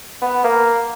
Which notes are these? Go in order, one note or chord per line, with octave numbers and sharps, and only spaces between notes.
B3
A#3